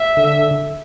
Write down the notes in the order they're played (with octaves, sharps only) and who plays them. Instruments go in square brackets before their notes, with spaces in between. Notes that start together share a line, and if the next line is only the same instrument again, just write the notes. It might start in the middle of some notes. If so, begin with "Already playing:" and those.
Already playing: [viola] E5
[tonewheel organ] D3